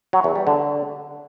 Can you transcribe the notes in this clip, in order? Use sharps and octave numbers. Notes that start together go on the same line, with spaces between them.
F#3
E2
G3
D3